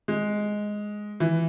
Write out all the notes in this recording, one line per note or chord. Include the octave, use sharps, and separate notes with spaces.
G#3
E3